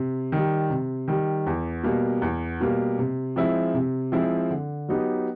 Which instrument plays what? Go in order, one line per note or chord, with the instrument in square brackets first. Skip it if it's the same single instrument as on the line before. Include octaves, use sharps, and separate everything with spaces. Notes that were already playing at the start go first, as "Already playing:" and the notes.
Already playing: [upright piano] C3
D#3 G3
C3
D#3 G3
E2
B2 G3 A#3
E2
B2 G3 A#3
C3
F3 G#3 C4 E4
C3
F3 G#3 C4 E4
D3
F#3 B3 D#4 G4